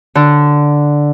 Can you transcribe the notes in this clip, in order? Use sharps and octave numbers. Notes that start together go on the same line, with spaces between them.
D3